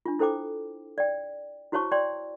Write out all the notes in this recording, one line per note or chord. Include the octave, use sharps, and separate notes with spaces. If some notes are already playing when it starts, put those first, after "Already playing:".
D4 F4
E4 A4 C5 G5 D6
D5 G5
E4 F#4 C5 C#5 A5 C#6
C#5 D5 G5 C6